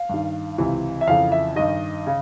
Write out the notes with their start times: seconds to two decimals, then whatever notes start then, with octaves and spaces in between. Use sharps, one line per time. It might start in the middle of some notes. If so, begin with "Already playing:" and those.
Already playing: F5
0.09 G2 D#3
0.58 C#2 C3 E3
1.01 E5
1.07 F2 C#3 E3 F5
1.32 E5
1.56 G2 D#3 D#5
2.07 C#3